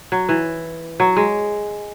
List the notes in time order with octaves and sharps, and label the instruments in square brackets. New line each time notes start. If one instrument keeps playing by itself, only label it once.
[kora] F#3
E3
F#3
G#3